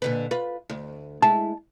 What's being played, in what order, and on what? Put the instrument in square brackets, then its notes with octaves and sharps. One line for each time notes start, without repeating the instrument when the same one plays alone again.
[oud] A#2 D3 B4
F4 B4
D2
[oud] G#3 E4 [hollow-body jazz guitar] A5